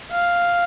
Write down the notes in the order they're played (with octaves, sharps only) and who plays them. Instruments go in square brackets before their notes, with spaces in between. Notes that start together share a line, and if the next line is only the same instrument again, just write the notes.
[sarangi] F5